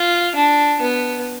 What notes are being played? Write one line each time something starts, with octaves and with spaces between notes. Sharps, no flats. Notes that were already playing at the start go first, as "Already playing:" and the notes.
Already playing: F4
D4
B3